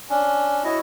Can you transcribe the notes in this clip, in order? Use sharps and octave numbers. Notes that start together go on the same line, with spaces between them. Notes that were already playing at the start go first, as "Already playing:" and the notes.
C#4 D4
E4 F#4 C#5 D#5